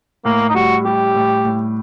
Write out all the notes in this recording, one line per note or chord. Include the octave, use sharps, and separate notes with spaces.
A2 A#3
D#4
G3 F#4
G3 G4
A2
A2